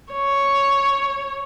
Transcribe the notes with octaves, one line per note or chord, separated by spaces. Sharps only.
C#5